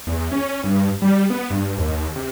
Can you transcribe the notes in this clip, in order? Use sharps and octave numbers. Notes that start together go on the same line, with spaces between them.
E2
C#4
G2
G3
B3
G2
D#2
C3